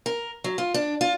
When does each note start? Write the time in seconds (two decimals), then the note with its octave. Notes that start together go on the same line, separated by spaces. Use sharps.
0.06 A#4
0.44 F#3
0.58 F4
0.74 D4
1.01 F4